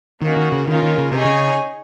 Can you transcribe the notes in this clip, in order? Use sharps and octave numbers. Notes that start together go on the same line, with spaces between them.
D#3 A#3 C#4 F#4
D#3
C#3
D#3 A#3 C#4 F4 A#4
D#3
C#3
C3 D#4 G#4 C#5 G#5
C#3